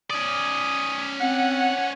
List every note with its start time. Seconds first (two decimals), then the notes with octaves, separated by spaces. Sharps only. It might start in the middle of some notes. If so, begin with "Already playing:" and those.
0.11 C#4 D5 D#6
1.21 C4 F#5